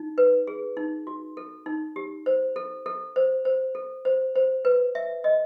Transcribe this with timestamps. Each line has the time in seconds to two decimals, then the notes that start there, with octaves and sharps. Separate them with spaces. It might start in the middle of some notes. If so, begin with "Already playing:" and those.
Already playing: D#4
0.18 B4
0.47 G#4
0.77 D#4
1.07 F#4
1.37 A4
1.66 D#4
1.96 G4
2.26 C5
2.56 A4
2.86 A4
3.16 C5
3.45 C5
3.75 A4
4.05 C5
4.35 C5
4.65 B4
4.95 E5
5.24 D#5